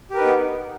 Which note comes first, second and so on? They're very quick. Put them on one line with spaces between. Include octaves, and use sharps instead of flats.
G4 A#4 B4 D#4 B3